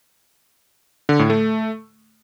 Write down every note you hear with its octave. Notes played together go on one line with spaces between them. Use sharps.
D3
A2
A3